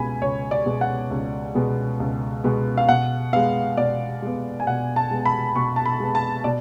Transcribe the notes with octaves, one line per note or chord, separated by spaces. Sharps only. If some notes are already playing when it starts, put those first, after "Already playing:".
Already playing: C#2 B2 G#3 B3 G#5 B5
C#2 C#5
D5
B2 G#3 B3
F#5
C#2
B2 G#3 B3
C#2
B2 G#3 B3
F5
B2 F#5
G#3 B3 F5
B2 D5
G#3 B3
G#5
B2 F#5
A5
G#3 B3
B5
B2 C#6
A5
B5
G#3 B3
A5
B2 D5